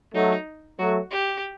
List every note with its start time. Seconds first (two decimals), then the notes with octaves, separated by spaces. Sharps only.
0.14 F#3 A3 D#4
0.79 F#3 A3 F#4
1.11 G4